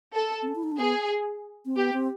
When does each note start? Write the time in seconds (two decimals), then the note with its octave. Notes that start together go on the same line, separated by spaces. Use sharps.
0.15 A4
0.42 C4
0.48 C#4
0.55 E4
0.63 D#4
0.72 D4
0.79 B3 G#4
1.65 C4
1.76 B3 G4
1.93 C4